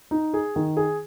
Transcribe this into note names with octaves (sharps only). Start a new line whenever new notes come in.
D#4
G#4
D#3
G#4